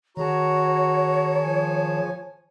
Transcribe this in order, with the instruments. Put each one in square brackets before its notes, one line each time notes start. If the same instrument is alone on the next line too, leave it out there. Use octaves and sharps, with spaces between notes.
[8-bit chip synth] D#3 G#4 A5 [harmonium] F#4 A#5 [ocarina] C#5
[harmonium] F3 G#5